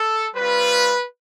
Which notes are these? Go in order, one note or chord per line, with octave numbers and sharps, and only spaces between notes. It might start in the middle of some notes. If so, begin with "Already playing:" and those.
Already playing: A4
G3 C4 F4 B4